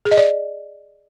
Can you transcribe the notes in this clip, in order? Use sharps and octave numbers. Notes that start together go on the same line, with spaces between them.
G#4
D#5
D5